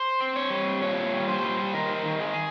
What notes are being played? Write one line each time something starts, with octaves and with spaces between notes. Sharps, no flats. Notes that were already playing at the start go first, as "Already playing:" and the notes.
Already playing: C5
C4
C#5
G3
A#2 C#5
G3
C5
G3
D#3 A#4
D#3
G#4